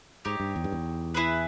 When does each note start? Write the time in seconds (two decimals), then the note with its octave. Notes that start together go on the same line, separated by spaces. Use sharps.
0.25 G#2 D#4 G4 C#5
0.40 G2
0.56 E2
0.64 G2
0.72 E2
1.14 E4 G#4 B4